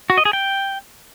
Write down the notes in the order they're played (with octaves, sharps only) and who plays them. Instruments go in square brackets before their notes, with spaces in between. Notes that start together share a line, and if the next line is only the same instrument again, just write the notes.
[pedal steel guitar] F#4
D#5
G#4
G5